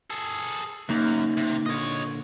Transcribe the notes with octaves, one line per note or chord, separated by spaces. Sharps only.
G#4 A4
F#2 C#3 A#3 D#4
C3
A#2 D3 C#5 D#5